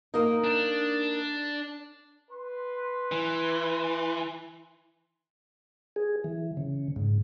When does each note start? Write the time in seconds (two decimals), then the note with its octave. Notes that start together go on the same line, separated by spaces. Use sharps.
0.14 A#3 D#4
0.44 D4
2.31 B4 C6
3.12 E3
5.96 G#4
6.24 E3
6.57 C#3
6.96 G#2